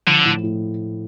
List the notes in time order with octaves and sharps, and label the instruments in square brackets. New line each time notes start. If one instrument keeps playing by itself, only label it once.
[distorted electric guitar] D3 [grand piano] F3
[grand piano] A2
A2